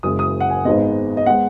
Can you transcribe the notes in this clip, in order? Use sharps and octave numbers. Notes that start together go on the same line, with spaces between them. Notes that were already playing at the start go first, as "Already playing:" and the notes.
F#1 F#2 C#3 G#3 D#6
D#6
F#5
G#5
G#1 G#2 G#3 B3 D#5
D#5
G#3 B3 F#5